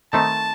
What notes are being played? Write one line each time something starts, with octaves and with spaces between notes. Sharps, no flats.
D#3 A3 C4 D#4 A5